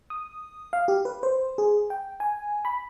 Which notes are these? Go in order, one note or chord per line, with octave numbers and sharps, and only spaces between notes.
D#6
F5
G4
B4
C5
G#4
G5
G#5
B5